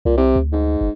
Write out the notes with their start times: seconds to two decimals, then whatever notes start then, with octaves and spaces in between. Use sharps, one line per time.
0.05 C2 A#2
0.17 C3
0.36 D2
0.52 G#2
0.81 G1